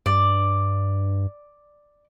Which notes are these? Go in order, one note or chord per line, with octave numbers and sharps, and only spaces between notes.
G2 D5